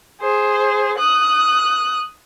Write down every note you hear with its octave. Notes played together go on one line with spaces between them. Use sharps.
G#4 C5
D#6 F#6